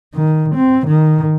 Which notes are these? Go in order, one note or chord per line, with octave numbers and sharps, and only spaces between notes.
D#3
C4
D#3